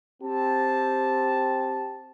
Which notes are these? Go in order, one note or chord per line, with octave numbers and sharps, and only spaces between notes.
C4 G4 A5